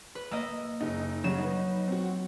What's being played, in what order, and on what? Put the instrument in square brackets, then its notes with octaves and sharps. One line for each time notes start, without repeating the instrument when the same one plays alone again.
[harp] B4
[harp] A#3 D#5 [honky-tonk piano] E6
[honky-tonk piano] F#1 D#4
[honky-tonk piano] C#3 G3 [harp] F#3 E7
[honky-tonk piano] D#4 B4
C4 F#4